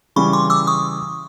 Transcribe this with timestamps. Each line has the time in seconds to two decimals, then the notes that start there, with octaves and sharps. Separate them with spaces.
0.16 C#3 E3 G3 B5 C#6
0.33 C6 D6
0.50 D6 E6
0.67 C#6 D#6